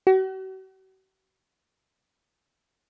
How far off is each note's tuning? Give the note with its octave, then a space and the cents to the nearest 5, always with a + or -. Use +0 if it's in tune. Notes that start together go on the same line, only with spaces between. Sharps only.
F#4 +45